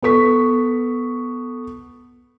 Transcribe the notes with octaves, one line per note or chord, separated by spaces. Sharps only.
B3 A4 C#6 B6